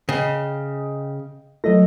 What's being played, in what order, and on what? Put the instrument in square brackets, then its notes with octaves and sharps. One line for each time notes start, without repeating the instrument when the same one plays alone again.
[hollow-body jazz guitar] C#3 [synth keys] D#5 G5
[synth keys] F#3 D#5 A#6 [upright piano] A3